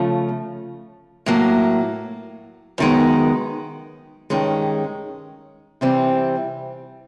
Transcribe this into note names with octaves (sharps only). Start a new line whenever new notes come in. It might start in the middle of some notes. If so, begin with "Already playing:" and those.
Already playing: C#3 F3 A3
A2 F#3 A#3
F#2 D#3 G#3 B3
G2 D#3 G#3 C#4
C3 E3 G3 C4